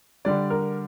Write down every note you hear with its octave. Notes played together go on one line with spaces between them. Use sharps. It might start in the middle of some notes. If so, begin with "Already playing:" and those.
D3 G3 D4 D5
A#4